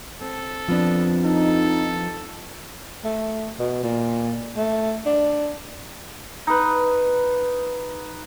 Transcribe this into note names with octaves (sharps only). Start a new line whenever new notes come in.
C4 A4
F2 F3 B3 D4
D#4 A4
A3
B2
A#2
A3
D4
D#4 B4